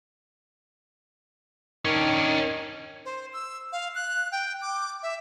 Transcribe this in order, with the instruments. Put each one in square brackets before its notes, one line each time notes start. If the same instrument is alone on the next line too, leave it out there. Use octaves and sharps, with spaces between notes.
[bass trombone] D#3 [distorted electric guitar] C#4 D4
[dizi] C5
E6
F5
F#6
G5
D6
E5